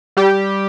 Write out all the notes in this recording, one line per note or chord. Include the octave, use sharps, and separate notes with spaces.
G3 G4